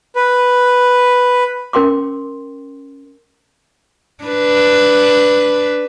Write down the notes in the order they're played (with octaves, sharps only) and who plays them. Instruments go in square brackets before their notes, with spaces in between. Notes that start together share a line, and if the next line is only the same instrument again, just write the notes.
[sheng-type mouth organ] B4
[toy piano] C#4 A#4 G5 C6 D6
[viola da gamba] D4 B4